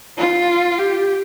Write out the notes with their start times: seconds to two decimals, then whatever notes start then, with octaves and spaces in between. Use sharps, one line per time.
0.18 F4
0.78 G4